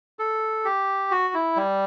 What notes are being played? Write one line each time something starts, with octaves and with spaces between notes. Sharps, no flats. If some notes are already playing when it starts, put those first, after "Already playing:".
A4
G4
F#4
E4
G3